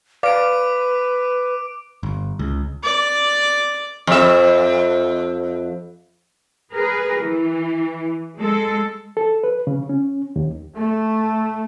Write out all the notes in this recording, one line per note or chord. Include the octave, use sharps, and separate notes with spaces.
B4 D5 F5 D6 D7
G1
C#2
D5
F2 E5
G#4 A#4 B4
E3
G#3 A4
A4
B4
C#3
C#4
D#2
A3